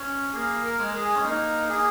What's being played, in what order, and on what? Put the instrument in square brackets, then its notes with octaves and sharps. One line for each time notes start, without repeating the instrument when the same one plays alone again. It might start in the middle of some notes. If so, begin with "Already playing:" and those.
Already playing: [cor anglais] C#4
[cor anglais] A#3 [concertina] G#4
[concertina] A#4
[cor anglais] G#3
[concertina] G#4
[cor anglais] C#4
[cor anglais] A#3 [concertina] D#4
[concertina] G#4